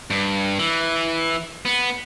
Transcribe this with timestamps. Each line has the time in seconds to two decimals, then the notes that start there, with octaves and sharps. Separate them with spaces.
0.10 G2
0.59 E3
1.65 B3